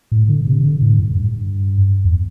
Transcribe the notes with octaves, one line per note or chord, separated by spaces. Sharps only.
A2
D3
C3
C3
D3
A2
G2
G2
E2